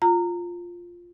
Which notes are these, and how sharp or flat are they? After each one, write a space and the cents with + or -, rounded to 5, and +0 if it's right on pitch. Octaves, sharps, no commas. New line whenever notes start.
F4 +0 A#5 -20